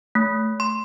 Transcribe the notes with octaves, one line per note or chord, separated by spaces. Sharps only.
A3
C6